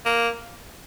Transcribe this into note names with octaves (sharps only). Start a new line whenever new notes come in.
A#3